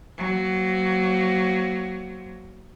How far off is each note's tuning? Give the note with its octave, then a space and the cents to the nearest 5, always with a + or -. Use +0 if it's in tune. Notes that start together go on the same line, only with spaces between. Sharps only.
F#3 +15 A#3 +0 C5 +0